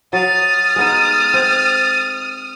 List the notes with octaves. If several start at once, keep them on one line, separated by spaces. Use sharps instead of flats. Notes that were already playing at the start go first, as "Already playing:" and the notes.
F#3 D#6 F6 A6
G#3 B3 D#4
C4